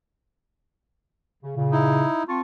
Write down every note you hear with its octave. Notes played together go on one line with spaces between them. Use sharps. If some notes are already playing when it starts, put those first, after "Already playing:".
C#3
A#2 C#3
D#4 E4
C4 F4 A5 C#6